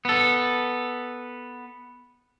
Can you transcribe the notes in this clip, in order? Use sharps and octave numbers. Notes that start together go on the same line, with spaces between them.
B3 A4